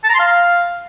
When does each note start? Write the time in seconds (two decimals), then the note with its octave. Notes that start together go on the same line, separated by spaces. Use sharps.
0.04 A5
0.09 A#5
0.14 C6
0.19 F5